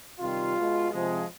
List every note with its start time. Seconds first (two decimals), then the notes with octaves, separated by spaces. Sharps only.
0.20 C3 D#3 G3 F4
0.55 B2 G#3
0.90 C3 F3 G#3